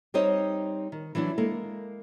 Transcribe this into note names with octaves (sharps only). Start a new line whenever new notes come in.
G3 C4 D#4 C5 C#5 D#5
D#3
E3 F#3 D4 E4
G#3 A#3 A4 A#4